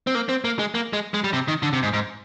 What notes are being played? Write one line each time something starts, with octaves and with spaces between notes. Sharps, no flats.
C4
A#3
C4
A#3
G#3
A#3
G#3
G#3
G3
C3
D#3
D3
C3
G#2
G#2